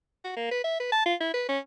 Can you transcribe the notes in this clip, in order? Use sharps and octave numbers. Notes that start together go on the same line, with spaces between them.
F#4
A#3
B4
E5
B4
A5
F4
E4
B4
C#4